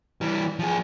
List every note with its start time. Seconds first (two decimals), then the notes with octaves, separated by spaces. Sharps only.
0.21 E3 G3
0.59 F3 G#4